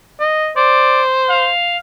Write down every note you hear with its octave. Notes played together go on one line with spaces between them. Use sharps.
D#5
C5 D5
F5